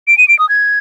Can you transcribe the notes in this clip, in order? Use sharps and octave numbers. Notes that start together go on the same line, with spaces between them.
D7
D#7
D7
D#6
G#6